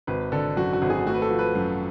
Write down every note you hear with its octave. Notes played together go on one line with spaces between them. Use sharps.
G#1 B4
D3 A4
F#2 F#4
F#4
G#1
G#4
A3 F#4
B4
A4
F3
B4
F#2